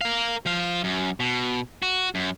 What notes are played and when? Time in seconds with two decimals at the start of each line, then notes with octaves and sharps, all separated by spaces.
0.01 A#4 F5
0.46 F3 F5
0.84 F#2
1.20 B2
1.82 F#4
2.15 F#2